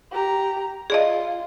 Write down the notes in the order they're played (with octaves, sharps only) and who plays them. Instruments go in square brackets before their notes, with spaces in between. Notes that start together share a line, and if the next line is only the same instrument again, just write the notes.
[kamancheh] G4 A#5
[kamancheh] F4 [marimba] G#4 D5 D#5